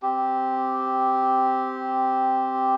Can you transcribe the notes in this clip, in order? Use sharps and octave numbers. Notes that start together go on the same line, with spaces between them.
C4 G4